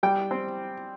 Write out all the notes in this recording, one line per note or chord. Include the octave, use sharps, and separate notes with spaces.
G3 G5
C4